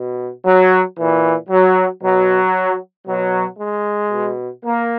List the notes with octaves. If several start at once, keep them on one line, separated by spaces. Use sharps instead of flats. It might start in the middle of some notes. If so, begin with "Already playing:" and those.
Already playing: B2
F#3
A#2 E3
F#3
B2 F#3
B2 F#3
G#3
B2
A#3